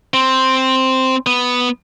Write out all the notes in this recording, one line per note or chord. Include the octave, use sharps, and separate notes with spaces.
C4
B3